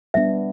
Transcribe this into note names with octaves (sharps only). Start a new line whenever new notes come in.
G3 B3 D4 E5